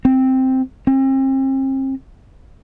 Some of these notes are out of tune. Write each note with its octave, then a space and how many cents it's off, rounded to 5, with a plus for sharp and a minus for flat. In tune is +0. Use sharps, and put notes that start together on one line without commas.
C4 +0
C4 +40